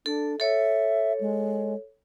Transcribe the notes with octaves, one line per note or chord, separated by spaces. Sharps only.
D4 A4
A4 C#5 E5
G#3